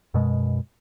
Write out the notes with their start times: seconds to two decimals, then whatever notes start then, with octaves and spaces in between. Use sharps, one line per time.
0.14 F#2 B2 G#3